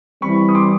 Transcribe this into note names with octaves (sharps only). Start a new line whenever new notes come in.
E3 G3 C4 E4 B5 C#6
D#6
C6 D6